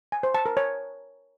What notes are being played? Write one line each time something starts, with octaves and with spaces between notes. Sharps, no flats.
G#5
C5
A5
A#4
C#5